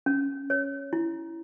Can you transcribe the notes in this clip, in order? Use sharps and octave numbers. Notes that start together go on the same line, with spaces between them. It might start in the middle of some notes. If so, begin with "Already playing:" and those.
C#4
C#5
E4